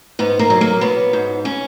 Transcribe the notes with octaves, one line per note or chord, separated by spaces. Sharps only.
G#2 B3
A#3
F#3
A#3
F#3 B3
G#2
C#4